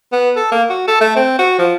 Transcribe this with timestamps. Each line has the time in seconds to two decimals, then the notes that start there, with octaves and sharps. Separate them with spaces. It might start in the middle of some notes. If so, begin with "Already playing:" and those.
0.12 B3
0.36 A4
0.52 A#3
0.70 F#4
0.87 A4
1.01 A3
1.16 C4
1.39 F#4
1.59 F3